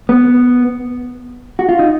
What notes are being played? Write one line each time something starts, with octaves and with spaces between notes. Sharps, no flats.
B3
F#4
F4
D#4